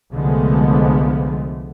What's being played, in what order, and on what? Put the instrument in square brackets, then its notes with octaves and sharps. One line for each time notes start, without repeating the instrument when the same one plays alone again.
[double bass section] C2 D3 F3 G#3 A3 B3